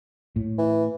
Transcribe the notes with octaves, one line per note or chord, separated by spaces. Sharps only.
A2
E3